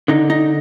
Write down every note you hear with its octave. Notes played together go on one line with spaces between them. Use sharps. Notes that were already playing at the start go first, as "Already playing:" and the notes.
D3 D#4
D#4